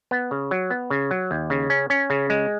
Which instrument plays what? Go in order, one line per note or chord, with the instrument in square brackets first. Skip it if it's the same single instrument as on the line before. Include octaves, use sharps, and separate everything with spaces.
[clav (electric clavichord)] B3
C#3
F#3
B3
C#3
F#3
D#2
C#3
C#4
C#4
C#3
G#3